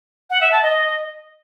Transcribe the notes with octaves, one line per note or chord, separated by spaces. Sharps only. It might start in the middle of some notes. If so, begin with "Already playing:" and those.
F#5
E5
A5
D#5